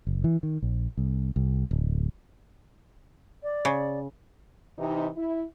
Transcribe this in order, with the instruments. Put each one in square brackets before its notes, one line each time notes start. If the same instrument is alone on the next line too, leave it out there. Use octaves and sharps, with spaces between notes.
[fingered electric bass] F#1
E3
D#3
A#1
C2
C2
D1
[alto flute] D5
[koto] C#3
[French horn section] C3 E3 D#4
E4